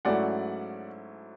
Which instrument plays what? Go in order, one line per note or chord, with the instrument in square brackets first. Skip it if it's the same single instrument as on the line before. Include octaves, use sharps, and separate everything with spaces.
[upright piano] G#2 F#3 A3 C#4 E4 D5 F#5